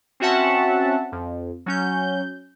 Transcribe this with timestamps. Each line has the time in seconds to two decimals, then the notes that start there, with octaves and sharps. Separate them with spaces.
0.20 C4 C#4 F#4 E5 F#5 A5
1.12 F2
1.66 F#3 C#4 G6